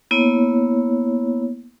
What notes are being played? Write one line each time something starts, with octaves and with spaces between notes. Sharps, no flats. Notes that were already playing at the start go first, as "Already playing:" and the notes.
A#3 B3 E4 C#5